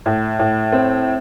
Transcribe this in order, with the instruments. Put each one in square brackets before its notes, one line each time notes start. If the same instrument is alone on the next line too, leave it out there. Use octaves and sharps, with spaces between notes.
[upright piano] A2
A2
C4